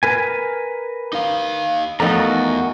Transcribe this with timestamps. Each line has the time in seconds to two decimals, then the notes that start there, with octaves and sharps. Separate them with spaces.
0.03 A#4 B4 G#5
1.13 D#4 F5
2.00 E2 F3 A3 D#4 F#4 A#4 A#5